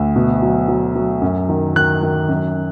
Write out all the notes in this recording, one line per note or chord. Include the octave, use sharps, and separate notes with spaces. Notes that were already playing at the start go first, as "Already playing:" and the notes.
Already playing: D2
B2
F#3
F#3
F#3
F#2
D#3
D#3 F#6
D#3
F#2